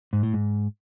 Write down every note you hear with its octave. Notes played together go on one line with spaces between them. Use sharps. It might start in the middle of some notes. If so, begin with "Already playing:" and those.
G#2
A2
G#2